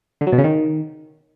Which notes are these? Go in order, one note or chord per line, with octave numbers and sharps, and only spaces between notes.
D3
F#3
B2
C#3
D#3